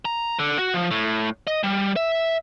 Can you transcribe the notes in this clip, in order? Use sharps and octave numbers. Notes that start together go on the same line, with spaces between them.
A#5
D3
F#4
F3
A2
D#5
G3
E5